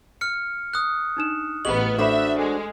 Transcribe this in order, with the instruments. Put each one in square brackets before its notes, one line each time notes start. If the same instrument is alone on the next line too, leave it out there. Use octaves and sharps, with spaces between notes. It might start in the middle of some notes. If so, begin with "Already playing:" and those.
[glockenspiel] F6 C#7
D#6 F#6
[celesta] D4 D#4 E7
[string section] A1 B3 [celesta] G4 G#4 D#5 [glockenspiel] F#7
[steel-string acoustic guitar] D4 F#4 C5 [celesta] A4 B5 [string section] E5
[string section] G#3 [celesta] A4